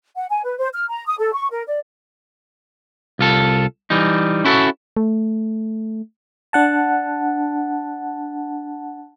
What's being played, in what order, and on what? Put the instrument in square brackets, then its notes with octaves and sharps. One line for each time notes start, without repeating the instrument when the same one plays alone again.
[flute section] F#5
G#5
B4
C5
F6
A#5
D#6
A4
C#6
A#4
D5
[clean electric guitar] C2 F4 A4
E3 G3 D#4
C#4 E4 F#4 A4
[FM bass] A3
[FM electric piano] D4 F#5 A5